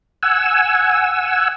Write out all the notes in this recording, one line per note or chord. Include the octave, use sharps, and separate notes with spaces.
F#5 G#5 E6